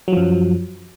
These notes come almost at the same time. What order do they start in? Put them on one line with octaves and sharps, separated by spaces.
F#3 F3 F#2